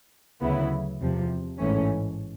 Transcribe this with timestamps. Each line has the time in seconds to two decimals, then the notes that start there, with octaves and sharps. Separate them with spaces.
0.41 D2 C#3 F#3 B3 E4
1.00 E2 C3 F3
1.58 A1 G#2 E3 A3 C#4